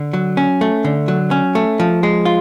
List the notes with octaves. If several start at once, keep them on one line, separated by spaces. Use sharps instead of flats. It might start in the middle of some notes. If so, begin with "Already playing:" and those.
Already playing: D3
F#3
C#4
A3
D3
F#3
C#4
A3
F3
G#3
F4